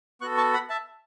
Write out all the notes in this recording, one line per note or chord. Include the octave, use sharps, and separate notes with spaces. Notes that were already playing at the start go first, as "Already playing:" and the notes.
B3 F#4 A4 C#6 F#6
A5 C#6
F#5 B5
E5 A5